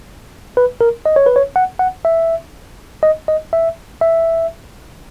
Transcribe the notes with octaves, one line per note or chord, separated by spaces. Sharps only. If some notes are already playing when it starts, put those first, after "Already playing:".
B4
A#4
D#5
C#5
B4
C#5
F#5
F#5
E5
D#5
D#5
E5
E5